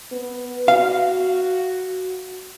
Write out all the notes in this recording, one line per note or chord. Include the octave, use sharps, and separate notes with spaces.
B3
F#4 F5